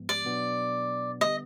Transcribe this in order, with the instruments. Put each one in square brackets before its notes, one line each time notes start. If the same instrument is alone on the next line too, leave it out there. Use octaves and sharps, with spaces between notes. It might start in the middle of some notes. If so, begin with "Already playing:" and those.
Already playing: [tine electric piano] G#2 F3 G#3 B3
[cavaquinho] D5
[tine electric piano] B2 F#3 B3 D4
[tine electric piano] D3 G3 B3 [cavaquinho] D#5